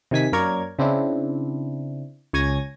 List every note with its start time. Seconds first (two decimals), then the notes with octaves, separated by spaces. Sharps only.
0.11 C3 D#3 G#5 B6
0.32 F#2 A#3 A#4 C#5 D5 G#6
0.79 C#3 C4 D4 E4
2.33 C#2 C#5 G#5 G#6 A#6